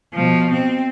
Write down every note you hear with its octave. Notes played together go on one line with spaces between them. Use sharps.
B2 F3
C4